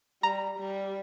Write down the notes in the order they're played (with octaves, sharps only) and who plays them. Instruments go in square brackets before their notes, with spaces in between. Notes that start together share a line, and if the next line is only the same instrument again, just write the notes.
[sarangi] G3 [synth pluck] A#5
[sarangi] G3